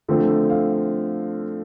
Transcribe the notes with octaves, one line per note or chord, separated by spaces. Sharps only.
D3 F3 A3 C4
F5